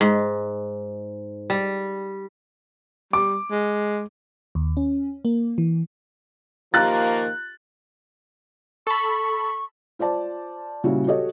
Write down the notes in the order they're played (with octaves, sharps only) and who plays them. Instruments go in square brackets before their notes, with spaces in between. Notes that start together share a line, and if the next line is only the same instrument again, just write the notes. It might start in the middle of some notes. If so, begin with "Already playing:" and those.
[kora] G#2
G3
[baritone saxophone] G3 [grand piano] D6
[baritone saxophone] G#3
[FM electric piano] D#2
C#4
A#3
E3
[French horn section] D#3 F3 A#3 [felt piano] F4 G4 [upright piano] A#5 F#6 A6
[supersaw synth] A4 B5 [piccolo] C#6
[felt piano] F4 C5 D5 A5
A#2 C#3 G3 C#4 E4 F#4
F#4 G4 A4 C#5 D#5